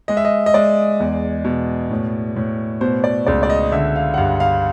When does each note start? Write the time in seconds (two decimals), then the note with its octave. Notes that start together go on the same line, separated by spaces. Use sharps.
0.08 G#3 D#5
0.17 E5
0.25 D#5
0.46 D#5
0.54 G#3 D5
1.00 E2
1.45 B2
1.91 A2
2.36 A2
2.81 B2 C5
3.04 D5
3.26 C#2 D5
3.43 D5
3.50 D#5
3.72 D3 E5
3.96 F5
4.14 F#5
4.18 G2 F5
4.40 F5